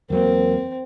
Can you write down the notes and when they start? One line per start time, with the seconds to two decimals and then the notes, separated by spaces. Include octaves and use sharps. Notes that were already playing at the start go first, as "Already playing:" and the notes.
0.10 E2 F#3 A#3 C4 A#4